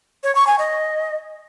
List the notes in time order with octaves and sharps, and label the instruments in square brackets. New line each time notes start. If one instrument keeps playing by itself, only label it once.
[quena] C#5
C#6
G#5
D#5